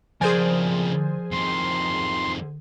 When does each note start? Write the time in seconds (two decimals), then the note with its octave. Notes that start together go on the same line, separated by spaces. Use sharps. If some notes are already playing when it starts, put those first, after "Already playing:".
0.21 F2 C#3 F3 G#4 A#4 C5 D5 G#5
1.32 F2 D#3 C6